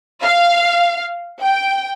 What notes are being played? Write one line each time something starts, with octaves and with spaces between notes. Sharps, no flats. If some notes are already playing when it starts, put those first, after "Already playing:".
F5
G5